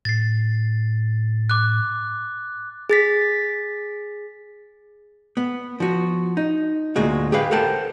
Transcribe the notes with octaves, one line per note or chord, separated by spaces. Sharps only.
A2 A6 C7
D6 F#6
G#4 A6 B6
B3
F3 F#4
D#4
D2 A#2 G#3 F#4
G4 G#4 B4 F5
A4 A#4 C5 F#5 G5 A5